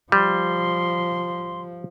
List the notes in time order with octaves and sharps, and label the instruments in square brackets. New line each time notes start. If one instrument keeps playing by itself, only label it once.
[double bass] F3 [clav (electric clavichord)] G3 [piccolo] C6